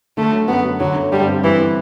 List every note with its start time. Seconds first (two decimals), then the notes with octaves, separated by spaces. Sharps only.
0.17 D3 A3
0.32 F#3
0.48 F#2 B3
0.64 F#2
0.80 D3 F#3
0.96 A3
1.12 G2 G3
1.27 C4
1.43 E3 G3
1.59 C4